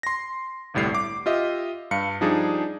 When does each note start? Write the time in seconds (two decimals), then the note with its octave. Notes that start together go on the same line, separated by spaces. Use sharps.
0.03 C6 A#6
0.74 G1 C2 A2 G3 C7
0.95 D6
1.26 F4 G4 D#5 E5
1.91 G2 F5 C#7
2.21 F3 G3 D4 D#4 G#4